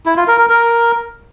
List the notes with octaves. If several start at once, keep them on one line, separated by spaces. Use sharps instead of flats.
E4
F4
A#4
A#4
A#4